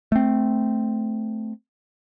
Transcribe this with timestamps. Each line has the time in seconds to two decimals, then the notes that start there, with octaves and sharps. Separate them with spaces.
0.12 A3 C4